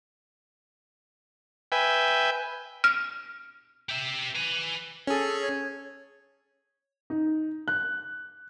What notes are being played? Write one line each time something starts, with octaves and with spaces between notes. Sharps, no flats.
B4 E5 G5 G#5
F6
G4 E5
B4 G#5
C#4 G#4 A4
C#5
D#4
F#6